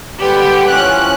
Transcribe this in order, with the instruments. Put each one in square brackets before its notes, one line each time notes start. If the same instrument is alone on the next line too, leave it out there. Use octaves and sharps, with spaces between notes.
[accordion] D3 G3 G#3 [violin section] B3 G4
[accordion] E3 F3 C#4 [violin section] F#6